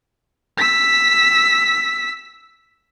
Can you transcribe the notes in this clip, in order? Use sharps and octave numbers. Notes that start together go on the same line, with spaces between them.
E6 B6